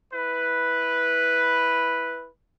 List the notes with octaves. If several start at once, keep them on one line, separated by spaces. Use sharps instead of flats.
E4 B4